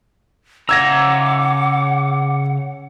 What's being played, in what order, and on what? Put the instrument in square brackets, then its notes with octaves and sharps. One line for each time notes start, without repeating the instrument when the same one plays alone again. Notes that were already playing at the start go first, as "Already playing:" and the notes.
[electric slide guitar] C#3 A#5 [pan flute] F#5 [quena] D6 [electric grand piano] E6 G#6 A#6